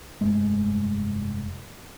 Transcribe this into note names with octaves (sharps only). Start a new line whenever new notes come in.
F1 G2 G#3 A3